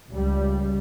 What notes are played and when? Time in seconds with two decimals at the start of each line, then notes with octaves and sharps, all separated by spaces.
0.13 C#2 G3